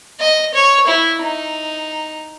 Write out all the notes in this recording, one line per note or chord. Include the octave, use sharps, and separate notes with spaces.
D#5
C#5
E4
D#4